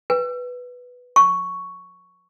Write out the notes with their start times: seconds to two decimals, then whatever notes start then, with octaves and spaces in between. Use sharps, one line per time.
0.10 B4
1.16 C#6